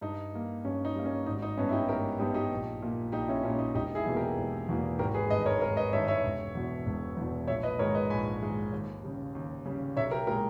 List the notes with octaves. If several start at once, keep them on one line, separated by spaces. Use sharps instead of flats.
G2 D#4
G3 A#3
G2 C#4
D#4
G3 A#3
C#4
G#1 D#4
D#4
G2 G3 B3 C#4
E4
D#4 G4
G#1 G4 A#4
G2 G3 B3 D#4 G4
D#4 G4
A#1
A#2 A#3
A#1 D#4 G4
C#4 E4
A#2 A#3 C#4
D#4
E1 D#4 G4
E4 G#4
E2 B2 A#3
G4 A#4
E1
E2 B2 A#3
G#1 G4 A#4
G#4 B4
G2 D#3 B4 D#5
A#4 C#5
G#1 A#4 C#5
B4 D#5
G2 D#3 C#5 E5
C#5 E5
E1
E2 B2
E1
E2 B2
A#1 C#5 E5
B4 D#5
G#2 D#3 G#3 A#4 C#5
B4 D#5
A#1 G#5 B5
G#2 D#3 G#3
D#2
C#3 G3
D#2
C#3 G3
B1 C#5 E5
G4 A#4
A#2 G#3 G4 A#4